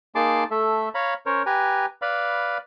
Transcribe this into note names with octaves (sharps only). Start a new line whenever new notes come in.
A#3 D#4 G#4 A5 C6 D6
A3 A4 E5
C#5 F5 A#5 B5
C#4 A#4 C5 C#5
G4 B4 G#5 A#5
B4 D5 F5 B5